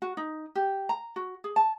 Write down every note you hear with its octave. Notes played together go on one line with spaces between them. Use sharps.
F#4
D#4
G4
A#5
F#4
G#4
A5